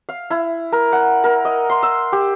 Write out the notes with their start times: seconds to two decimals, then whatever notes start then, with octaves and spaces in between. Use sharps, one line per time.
0.09 F5
0.30 E4
0.72 A#4
0.92 F#5
1.24 A#4
1.45 D#5
1.69 C6
1.83 E6
2.12 G4